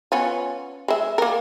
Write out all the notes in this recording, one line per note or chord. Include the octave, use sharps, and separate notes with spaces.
B3 C#4 F4
G#3 E5
A#3 A#4